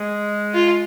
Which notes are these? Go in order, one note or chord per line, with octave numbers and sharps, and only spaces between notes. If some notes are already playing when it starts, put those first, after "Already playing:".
Already playing: G#3
F4